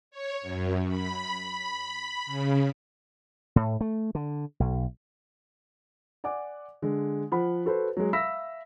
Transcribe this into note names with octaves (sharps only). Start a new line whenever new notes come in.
C#5
F#2
B5
B5
C#3
A2
A3
D3
B1
D5 F#5 G#5 D6
D3 G#3
F3 F#5 B5
F#4 A4 B4 C5
F#3 G#3
E5 F5 B5 E6 A#6 B6